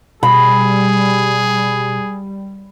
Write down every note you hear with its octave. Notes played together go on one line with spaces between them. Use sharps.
B2 G3 G#4 B5